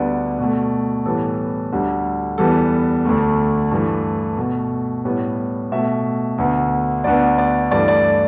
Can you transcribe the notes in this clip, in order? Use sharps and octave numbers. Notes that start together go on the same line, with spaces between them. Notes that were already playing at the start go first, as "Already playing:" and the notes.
Already playing: D2 D3 G3 B3 D5
B2 A3
A2 E3 G3 B3 A4
D2 D3 G3
E2 E3 G3 B3 A4
D2 D3 A3
G2 E3 A3
B2 A3
A2 G3 B3
B2 A3 E5
D2 D3 B3
D2 D3 B3 D5
D5
G2 E3 A3 D5
D5